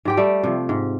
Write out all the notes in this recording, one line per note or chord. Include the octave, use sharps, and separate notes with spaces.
G#2 G4 G5
G3 A3
C3 F3
G#2